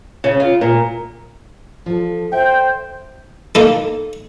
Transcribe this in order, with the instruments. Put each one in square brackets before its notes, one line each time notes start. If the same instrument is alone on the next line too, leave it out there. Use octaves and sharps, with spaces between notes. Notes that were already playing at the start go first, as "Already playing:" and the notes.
[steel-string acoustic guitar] C#3
F4
A#2
F3 A4
[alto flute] C5 [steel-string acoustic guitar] E5 [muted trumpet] G5
[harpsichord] A#3 D#4 A4